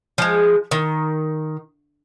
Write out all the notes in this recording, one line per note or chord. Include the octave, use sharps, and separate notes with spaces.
F3 G#3
D#3